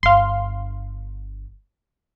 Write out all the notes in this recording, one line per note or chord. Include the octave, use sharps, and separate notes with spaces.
G1 D3 F5 C6